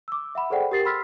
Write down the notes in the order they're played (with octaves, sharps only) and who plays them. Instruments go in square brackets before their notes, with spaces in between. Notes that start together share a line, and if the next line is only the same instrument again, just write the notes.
[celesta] D6 E6
E5 F#5 B5
G#4 A4 C5 D5 F#5 G5
G4 A#4 A6 C7
B5 C6 E6 F6 B6